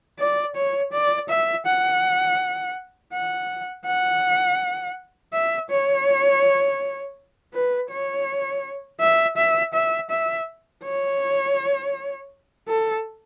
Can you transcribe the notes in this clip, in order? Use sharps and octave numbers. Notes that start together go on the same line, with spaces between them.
D5
C#5
D5
E5
F#5
F#5
F#5
E5
C#5
B4
C#5
E5
E5
E5
E5
C#5
A4